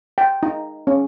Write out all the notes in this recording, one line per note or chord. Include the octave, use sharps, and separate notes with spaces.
G5
D#4
C#4